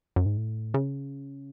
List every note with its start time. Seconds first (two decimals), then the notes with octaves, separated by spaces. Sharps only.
0.16 F#2
0.26 G#2
0.37 A2
0.74 C#3